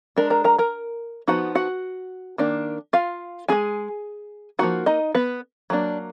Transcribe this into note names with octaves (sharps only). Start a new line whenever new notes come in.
G#3 D4 A#4 A#5
A#4 A#5
A#4 A#5
A#4 A#5
F3 B3 D#4 F#4 F#5
F#4 F#5
D#3 A#3 D4
F4 F5
G#3 D4 G#4 G#5
F3 A#3 D#4 F#4 F#5
D#4 D#5
B3 B4
F#3 A#3 D4